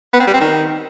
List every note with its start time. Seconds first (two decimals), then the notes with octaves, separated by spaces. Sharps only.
0.13 B3
0.20 C4
0.27 G3
0.34 C4
0.40 D#3